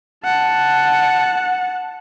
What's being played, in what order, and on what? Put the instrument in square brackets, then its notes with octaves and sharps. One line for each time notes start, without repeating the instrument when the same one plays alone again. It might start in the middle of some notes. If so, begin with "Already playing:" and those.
[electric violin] F#5 A5